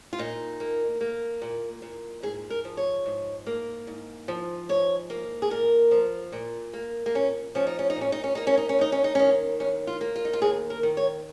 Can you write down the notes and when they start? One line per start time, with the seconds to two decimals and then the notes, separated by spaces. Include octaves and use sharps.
0.13 F4
0.19 A#2 D#4
0.60 A#3
1.01 A#3
1.42 A#2
1.82 A#2
2.23 G#2 G#4
2.50 A#4
2.65 F3
2.77 C#5
3.06 G#2
3.47 A#3
3.87 G#2
4.28 F3
4.69 G#2 C#5
5.10 A#3
5.42 G#4
5.50 A#2 A#4
5.91 F3
6.32 A#2
6.73 A#3
7.06 A#3
7.15 A#2 C#4
7.55 F3 C#4
7.67 D#4
7.79 C#4
7.90 D#4
7.96 A#2
8.01 C#4
8.12 D#4
8.24 C#4
8.35 A#3 D#4
8.47 C#4
8.58 D#4
8.69 C#4
8.79 D#2 D#4
8.92 C#4
9.04 D#4
9.15 D#3 C#4
9.60 D#2 C#4
9.87 F4
10.01 A#3
10.16 F4
10.25 D#4
10.33 F4
10.42 D#2 G#4
10.70 A#4
10.83 D#3
10.97 C#5